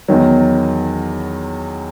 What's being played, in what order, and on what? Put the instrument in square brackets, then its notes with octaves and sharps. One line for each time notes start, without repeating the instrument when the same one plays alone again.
[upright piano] E2 D#3 F#3